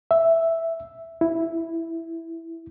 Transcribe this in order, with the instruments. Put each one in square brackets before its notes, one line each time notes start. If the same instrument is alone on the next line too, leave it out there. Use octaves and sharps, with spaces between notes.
[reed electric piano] E5
E4